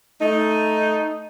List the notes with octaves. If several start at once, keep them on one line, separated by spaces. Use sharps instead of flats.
A3 D#4